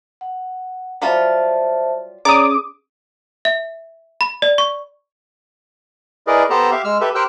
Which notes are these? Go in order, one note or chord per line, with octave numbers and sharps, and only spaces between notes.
F#5
F#3 G3 F4 C5 E5 A5
C#4 G#4 C#5 D5 A#5 D6 D#6
E5
B5
D5
C#6
E4 G#4 A#4 B4 D5 D#5
B3 G4 A4 C5 A5 A#5
G4 E5 F5
G#3 E6 F6
G4 A4 B4 E5
G4 A#4 C5 G5 E6 F#6